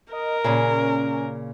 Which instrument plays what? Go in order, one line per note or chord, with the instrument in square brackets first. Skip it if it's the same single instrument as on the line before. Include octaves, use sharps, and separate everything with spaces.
[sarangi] A#4 [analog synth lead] D#5
[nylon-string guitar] A#2 C#3 [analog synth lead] C#4